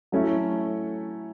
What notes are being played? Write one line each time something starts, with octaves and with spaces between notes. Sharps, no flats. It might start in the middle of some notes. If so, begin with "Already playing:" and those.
F#3 A3 C#4 E4